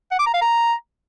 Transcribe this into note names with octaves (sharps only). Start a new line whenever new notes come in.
F#5
D6
A#5
F5
A#5